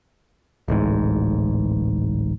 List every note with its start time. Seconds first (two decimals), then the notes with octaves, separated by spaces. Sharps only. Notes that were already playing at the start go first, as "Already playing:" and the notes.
0.68 D1 A1 G#2